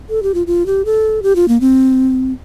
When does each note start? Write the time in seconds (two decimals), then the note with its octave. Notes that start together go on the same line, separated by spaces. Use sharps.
0.09 A4
0.23 G4
0.34 F4
0.47 F4
0.66 G4
0.85 A4
1.23 G4
1.36 F4
1.48 A#3
1.61 C4